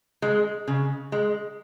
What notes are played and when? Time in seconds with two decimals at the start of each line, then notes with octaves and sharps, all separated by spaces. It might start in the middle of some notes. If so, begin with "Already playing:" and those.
0.22 G#3
0.68 C#3
1.12 G#3